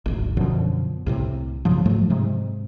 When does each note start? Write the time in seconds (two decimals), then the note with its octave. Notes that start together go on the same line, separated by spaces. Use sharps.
0.06 D1 G#1
0.37 F#2 B2 D3 F3
1.06 C2 A2 C3
1.65 G2 C#3 F3
1.86 G#2 F3 F#3 A3
2.09 G#2 C3 G#3